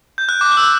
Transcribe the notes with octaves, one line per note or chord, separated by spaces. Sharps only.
G6
F#6
D6
F#6
E6